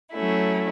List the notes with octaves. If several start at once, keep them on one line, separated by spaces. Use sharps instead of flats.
F#3 A3 C#4 E4